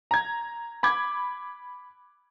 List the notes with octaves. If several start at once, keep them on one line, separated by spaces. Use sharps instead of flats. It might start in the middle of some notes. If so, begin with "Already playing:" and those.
A#5 G#6
B5 D6 G#6